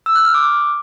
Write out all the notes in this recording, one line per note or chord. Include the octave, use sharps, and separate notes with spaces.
E6
F#6
F6
D6